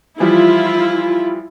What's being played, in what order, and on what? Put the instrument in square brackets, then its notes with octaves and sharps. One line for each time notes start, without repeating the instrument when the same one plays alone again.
[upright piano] E3 F3 G3 [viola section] E4 F4